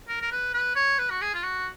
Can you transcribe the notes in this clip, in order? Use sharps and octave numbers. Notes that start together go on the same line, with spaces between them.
A#4
A#4
B4
B4
C#5
B4
F#4
G#4
F4
F#4